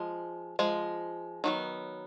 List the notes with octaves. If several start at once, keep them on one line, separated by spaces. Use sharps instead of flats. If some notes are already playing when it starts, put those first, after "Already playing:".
Already playing: F3 G#3
F3 G#3
D#3 F#3 B3